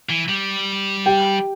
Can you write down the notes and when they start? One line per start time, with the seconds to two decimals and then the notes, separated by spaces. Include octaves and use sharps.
0.09 E3
0.29 G3
1.06 G4 G5